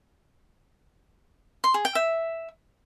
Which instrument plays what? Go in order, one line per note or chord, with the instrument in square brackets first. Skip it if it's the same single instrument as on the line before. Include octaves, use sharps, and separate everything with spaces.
[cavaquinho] C6
G#4
G5
E5